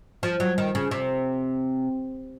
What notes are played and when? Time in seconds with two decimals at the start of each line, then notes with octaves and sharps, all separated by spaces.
0.23 F3
0.40 F#3
0.58 D#3
0.75 C#3
0.91 C3